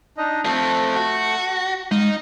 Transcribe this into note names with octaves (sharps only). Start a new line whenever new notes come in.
D4 D#4 D#5
F3 A3 C4 A4
F#4
G#3 D#4 F5